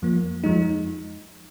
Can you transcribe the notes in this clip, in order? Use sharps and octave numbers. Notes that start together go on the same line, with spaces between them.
F2 F3 A#3
F2 F3 G#3 D#4